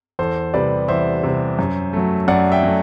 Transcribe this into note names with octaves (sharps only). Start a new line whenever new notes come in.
E2 A4 C5
C3 G3 B4 D5
E2 C5 E5
C3 G3
F#2
F#3 A3
F#2 D5 F#5
E5 G5
F#3 A3